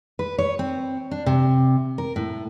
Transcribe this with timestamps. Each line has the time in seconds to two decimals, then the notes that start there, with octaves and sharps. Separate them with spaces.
0.19 B4
0.38 C#5
0.59 C4
1.11 D4
1.26 C3
1.98 A#4
2.16 A2